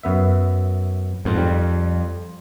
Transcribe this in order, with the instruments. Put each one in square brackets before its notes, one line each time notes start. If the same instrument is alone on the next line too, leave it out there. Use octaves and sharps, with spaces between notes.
[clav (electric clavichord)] F#2 B3 E5
[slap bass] F2 [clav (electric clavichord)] G#2
[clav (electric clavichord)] G3